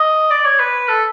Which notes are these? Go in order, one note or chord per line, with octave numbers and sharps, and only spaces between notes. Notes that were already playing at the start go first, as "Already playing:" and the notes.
Already playing: D#5
D5
C#5
B4
A4